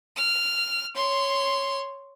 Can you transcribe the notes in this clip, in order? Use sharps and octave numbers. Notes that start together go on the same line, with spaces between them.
F6
C#5 C6